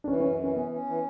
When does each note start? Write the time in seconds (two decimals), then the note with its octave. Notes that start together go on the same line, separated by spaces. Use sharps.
0.04 D4
0.08 E3 C#4
0.20 C#4
0.24 F#2
0.39 E3 C#4
0.56 B3 C#4
0.71 C#4
0.87 E3